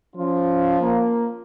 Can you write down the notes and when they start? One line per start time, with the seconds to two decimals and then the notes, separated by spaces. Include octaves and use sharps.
0.16 F3 C#4 F4
0.81 A#3